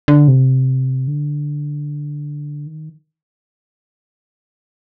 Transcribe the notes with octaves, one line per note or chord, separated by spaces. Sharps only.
D3
C3
D3
D#3